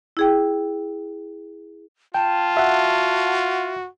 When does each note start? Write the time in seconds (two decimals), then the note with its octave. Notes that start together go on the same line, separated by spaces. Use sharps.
0.17 E4 G#4 G5
2.14 F4 G5 A5
2.57 F#4 E5 F#5